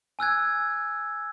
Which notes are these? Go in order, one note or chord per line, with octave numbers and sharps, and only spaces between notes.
G#5 E6 F#6 G#6